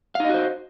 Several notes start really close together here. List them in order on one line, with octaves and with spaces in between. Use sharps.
F5 D#4 D#5 F#4 C5